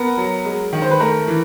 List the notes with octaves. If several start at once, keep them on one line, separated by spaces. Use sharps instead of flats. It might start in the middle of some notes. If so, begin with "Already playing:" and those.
Already playing: B3 A#4
F#3
G#3
D#3
C5
B4
A3 A#4
E3